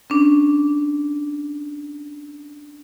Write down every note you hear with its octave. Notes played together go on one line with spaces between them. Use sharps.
C#4 D4